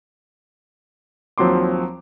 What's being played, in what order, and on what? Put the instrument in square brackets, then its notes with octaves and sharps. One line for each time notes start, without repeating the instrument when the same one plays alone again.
[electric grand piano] D#2 F3 F#3 C4 C6 D6